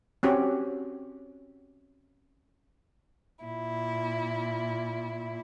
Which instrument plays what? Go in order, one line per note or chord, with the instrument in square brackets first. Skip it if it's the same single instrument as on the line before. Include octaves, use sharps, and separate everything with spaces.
[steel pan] C4 C#4 F#4 G4
[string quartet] A#2 E4